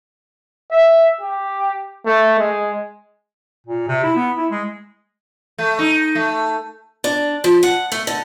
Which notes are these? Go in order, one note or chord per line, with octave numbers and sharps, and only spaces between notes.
E5
G4
A3
G#3
A#2
C3
E4
B3
E4
G#3
A3
D#4
A3
D4
F3
F#5
A3
D3